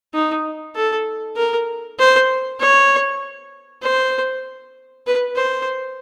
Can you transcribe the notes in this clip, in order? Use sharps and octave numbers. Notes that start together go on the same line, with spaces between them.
D#4
A4
A#4
C5
C#5
C5
B4
C5